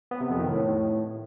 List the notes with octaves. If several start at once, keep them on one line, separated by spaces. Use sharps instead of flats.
B3
C3
F2
D#3
A2